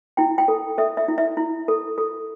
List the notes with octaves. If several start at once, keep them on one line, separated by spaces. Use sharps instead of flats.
E4 G5
G5
A4
A4 E5
E5
E4
E5
E4
A4
A4